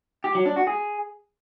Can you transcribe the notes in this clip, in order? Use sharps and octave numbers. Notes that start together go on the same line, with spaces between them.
G4
F#3
D4
F#4
G#4